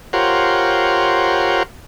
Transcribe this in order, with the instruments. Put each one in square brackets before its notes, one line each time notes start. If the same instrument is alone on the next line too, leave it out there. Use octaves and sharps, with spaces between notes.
[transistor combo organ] F4 G4 A#4 C5 C#5 F#5